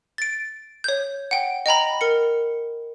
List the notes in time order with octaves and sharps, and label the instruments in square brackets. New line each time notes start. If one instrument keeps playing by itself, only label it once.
[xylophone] A6 D7
C#5 G6
F#5 G5
D#5 G5 A#5 B5
A#4 C#7